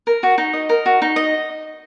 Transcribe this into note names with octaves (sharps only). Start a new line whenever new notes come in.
A#4
F#4
D#4
D#5
A#4
F#4
D#4
D#5